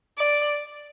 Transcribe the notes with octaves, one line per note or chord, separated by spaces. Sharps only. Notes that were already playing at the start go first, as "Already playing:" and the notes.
D5